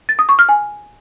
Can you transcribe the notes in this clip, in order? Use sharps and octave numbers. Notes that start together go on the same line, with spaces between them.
A6
D#6
C#6
F6
G#5